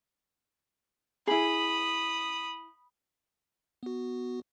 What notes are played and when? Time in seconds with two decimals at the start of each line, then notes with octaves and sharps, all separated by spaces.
1.27 E4 G#4 B5 D#6
3.83 B3 F#4